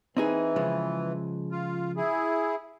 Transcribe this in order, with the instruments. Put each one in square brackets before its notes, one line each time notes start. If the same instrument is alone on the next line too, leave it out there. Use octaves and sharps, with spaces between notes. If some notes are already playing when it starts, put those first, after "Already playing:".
[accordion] E3 [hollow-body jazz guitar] C4 D#4 G#4
[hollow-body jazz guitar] C#3 F3 G#3
[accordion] F4
E4 G#4